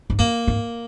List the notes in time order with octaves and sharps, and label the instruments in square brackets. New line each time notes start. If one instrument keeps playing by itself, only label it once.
[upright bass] G#2
[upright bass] F#2 [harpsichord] A#3
[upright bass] G#2